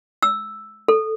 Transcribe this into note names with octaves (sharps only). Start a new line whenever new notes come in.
E6
A4